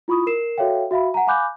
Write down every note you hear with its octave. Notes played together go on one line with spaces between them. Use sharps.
E4 F4 B5 C#6 D#6
A#4 C7 E7
F#4 A4 C#5 E5 F5 G5
F#4 E5 F5 B5
F#5 G#5 A#5
F5 G#5 B5 D6 F#6 G6